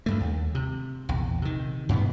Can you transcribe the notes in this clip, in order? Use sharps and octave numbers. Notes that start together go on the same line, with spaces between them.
D2 G2 A3
D#2
C3
A#1 E2
C3 D#3
G2 B2 D#3 B3